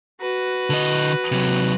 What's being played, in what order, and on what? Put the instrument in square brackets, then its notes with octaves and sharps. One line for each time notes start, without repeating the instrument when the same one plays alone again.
[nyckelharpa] F#4 B4
[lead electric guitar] D3 D#5
C3 F#3